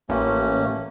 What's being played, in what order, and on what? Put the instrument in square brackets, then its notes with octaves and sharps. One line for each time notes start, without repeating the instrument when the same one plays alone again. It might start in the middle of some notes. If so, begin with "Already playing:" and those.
[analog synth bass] A1 [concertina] A3 A#3 C#4